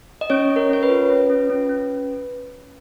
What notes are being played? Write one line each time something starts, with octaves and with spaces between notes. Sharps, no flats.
D#5
C#4 C#5
C#4
A#4
C#4 C#5
B4
F4
C#4
C#4
C#4
C#4